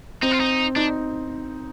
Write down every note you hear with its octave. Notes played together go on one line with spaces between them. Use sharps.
C4 D#4
F4
D#4
D4 D#4